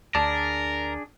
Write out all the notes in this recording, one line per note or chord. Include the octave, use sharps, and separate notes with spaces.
D2 D4 G#4 A#4 D5 A5